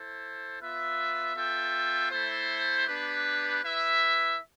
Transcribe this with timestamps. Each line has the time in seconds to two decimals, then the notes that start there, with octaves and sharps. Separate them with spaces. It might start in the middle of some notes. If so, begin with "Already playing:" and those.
Already playing: E4 A4 C5
0.59 B3 F4 B4 E5
1.35 B3 F4 A4 E5 G5
2.10 A3 E4 A4 C5
2.87 B3 D4 G4 B4
3.63 E4 B4 E5